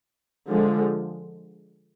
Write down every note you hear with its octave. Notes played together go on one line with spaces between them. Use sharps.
D3 F3 G#3